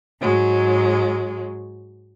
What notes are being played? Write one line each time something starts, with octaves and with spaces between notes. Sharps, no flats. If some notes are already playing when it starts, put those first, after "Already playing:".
G#2 F#3 G#3